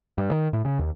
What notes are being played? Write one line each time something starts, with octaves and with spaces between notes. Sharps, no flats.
G2
D#3
A2
C#3
D#2